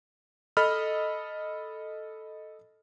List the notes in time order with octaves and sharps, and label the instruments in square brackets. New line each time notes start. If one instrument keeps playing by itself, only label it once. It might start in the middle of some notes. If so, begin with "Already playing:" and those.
[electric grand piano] A4 D#5 B5 F6